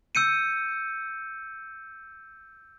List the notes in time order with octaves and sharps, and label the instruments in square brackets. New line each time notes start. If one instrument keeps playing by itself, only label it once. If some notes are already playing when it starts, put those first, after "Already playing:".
[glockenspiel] E6 G6 C#7 D#7